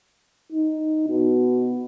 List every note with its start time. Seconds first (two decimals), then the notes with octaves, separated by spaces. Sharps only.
0.52 D#4
1.08 B2